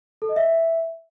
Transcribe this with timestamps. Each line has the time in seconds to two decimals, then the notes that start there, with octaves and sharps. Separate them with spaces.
0.22 A4
0.29 D#5
0.36 E5